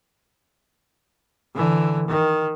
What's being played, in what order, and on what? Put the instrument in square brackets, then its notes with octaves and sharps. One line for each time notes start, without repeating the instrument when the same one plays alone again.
[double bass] D3 E3
D#3